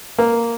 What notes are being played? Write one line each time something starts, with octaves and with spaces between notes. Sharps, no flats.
A#3